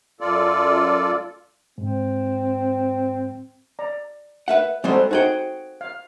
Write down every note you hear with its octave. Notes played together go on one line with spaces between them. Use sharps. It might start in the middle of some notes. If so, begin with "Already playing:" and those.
F#2 F4 A4 D5
G#2 C4
D5 A#5
B4 E5 F#5
G3 G#3 C4 F#4 A4 C5
D#4 F#4 G#4 C5 F#5 G5
F5